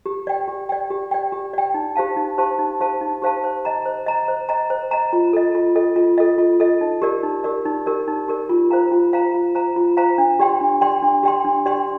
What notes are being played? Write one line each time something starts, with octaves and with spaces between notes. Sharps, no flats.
G4
D5 G5
G4
D5 G5
G4
D5 G5
G4
D5 G5
D#4
G4 C5 F5 A5
D#4
G4 C5 F5 A5
D#4
G4 C5 F5 A5
D#4
G4 C5 F5 A5
C5
D#5 A#5
C5
D#5 A#5
C5
D#5 A#5
C5
D#5 A#5
F4
A4 D#5
F4
A4 D#5
F4
A4 D#5
F4
A4 D#5
D#4
G4 A#4 D5
D#4
G4 A#4 D5
D#4
G4 A#4 D5
D#4
G4 A#4 D5
F4
C5 F5 A#5
F4
C5 F5 A#5
F4
C5 F5 A#5
F4
C5 F5 A#5
D4
G4 D5 G5 C6
D4
G4 D5 G5 C6
D4
G4 D5 G5 C6
D4
G4 D5 G5 C6